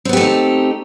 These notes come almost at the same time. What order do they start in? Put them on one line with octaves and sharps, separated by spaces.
C4 B3 G4 A3 D#4